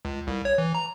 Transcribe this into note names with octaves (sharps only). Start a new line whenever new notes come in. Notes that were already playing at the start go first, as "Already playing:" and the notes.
C#2
C2
C#5
E3
A#5